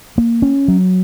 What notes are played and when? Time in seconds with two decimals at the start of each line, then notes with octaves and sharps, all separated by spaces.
0.18 A#3
0.42 C#4
0.68 F#3